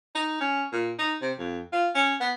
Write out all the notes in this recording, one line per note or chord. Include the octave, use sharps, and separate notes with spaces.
D#4
C#4
A#2
D#4
C3
F2
F4
C#4
B3